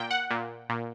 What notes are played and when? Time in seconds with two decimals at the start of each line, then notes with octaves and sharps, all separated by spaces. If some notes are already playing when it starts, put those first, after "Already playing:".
Already playing: A#2 G5
0.11 F#5
0.30 A#2
0.69 A#2